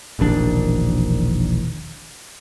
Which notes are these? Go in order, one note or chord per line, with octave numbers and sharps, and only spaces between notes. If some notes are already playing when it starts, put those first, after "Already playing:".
E1 A#1 D#3 D4